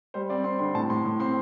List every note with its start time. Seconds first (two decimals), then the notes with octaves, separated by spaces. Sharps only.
0.14 G3 C5
0.30 C4 D5
0.44 C4 C6
0.59 D3 C6
0.75 A2 A5
0.90 A2 C6
1.05 A2
1.19 C4 C6